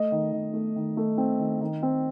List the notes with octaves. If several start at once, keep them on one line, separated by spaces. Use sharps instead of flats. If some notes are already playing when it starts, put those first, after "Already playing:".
Already playing: A3 D#5
D#3
D#3
A3
D#3
A3
C4
D#3
D#3
C4